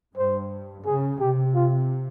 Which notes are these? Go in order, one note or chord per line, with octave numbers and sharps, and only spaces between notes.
G2 C5
C#3 G#4
C3 G4
F4